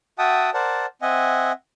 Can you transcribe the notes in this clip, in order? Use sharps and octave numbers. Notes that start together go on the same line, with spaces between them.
F#4 E5 F#5 G5 A5 D#6
A#4 C5 D5 F#5 A5
C4 D#5 E5 F#5 G#5